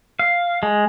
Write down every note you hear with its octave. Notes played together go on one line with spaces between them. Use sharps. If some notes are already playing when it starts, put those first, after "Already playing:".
F5
G#3